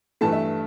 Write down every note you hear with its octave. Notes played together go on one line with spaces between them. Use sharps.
G2 E3 A3 A5
E5